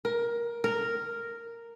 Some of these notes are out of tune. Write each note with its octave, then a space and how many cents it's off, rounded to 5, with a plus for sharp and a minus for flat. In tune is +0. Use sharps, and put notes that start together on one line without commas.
A#4 +15
A#4 -5